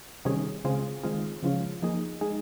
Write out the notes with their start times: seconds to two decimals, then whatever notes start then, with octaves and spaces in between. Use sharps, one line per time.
0.25 C3 D#3 G3 C#4 G#4
0.64 C#3 G#3 C4 F4 G#4
1.03 D#3 G#3 C4 F4 G#4
1.43 C#3 F3 G#3 C#4 F4
1.82 F3 A#3 D#4 G#4
2.21 G#3 D#4 G#4